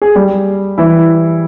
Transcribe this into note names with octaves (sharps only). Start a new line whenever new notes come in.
G#4
G3 G4
E3 E4